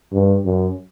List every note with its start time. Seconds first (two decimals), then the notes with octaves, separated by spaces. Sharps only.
0.12 G2
0.45 F#2